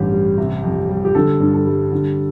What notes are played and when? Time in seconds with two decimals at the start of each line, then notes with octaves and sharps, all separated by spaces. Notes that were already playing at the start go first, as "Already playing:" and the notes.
Already playing: A1 G2 G3 G4
0.12 G3
0.38 C3
0.64 F2
0.89 G3
1.05 G4
1.15 D3 A4
1.40 G2
1.54 A4
1.66 G3
1.92 D3